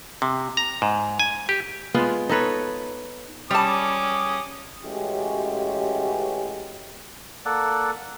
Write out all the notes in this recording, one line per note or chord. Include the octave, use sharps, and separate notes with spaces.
C3
A#5
G#2
G#5
G4
G#3 B3 F4
D#4 A4 B4 C#5
G3 C#4 A5 D6 D#6
A1 G#3 C#4 F#4 G4
A#3 A4 D5 F#5